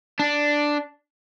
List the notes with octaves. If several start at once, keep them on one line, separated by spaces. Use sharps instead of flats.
D4